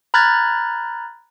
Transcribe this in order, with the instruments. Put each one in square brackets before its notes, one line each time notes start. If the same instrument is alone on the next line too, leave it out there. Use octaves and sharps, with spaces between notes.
[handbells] A#5 B5 F6 F#6 G#6 A6